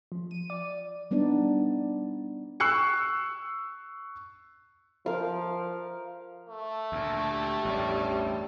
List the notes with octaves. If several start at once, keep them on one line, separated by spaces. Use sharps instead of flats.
F3
D#7
D5
G3 B3 D4 D#4 D5
C#6 E6 F#6 C7 C#7
F3 A#4 F5
A3
D2 A#2
G4
A1 E2 G2 G3